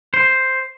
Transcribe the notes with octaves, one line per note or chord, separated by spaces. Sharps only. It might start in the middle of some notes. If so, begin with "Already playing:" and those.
C5